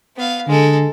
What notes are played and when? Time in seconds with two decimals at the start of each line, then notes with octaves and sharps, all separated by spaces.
0.16 B3 F5
0.47 D3 G#3 A4